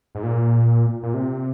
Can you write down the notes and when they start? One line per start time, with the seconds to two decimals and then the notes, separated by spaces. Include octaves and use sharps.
0.15 G#2
0.23 A#2
1.03 A#2
1.14 C3